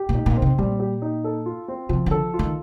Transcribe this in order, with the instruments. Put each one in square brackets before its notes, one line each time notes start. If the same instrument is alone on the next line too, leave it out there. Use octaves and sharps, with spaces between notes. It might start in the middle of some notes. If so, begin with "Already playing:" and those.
Already playing: [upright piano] G4
[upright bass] A#2
[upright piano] D#4
[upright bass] A#2
[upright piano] C4
[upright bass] C3
[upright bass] A#2 [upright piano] G3
[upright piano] G4
D#4
A4
F4
C4
[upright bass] C3 [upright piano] F3
[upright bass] D3 [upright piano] A4
[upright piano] F4
[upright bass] D#3